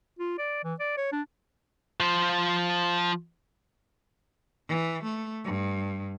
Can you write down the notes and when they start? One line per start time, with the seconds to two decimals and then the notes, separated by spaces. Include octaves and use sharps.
0.19 F4
0.38 D5
0.64 E3
0.80 D5
0.97 C#5
1.12 D4
2.00 F3 C5
4.69 E3
5.04 A3
5.45 G2